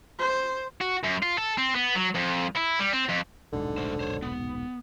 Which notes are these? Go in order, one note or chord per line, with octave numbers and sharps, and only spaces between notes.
C5
F#4
F#2
F4
A4
C4
B3
F#3
F2
E4
G3
C4
F2
D#1 B1 G#2 D3
A3 C5
C5 C#5
B3